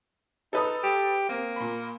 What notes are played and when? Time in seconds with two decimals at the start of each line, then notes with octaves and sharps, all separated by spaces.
0.53 D#4 A4 B4 D#6
0.83 G4
1.29 A#3 C4
1.56 A#2 B5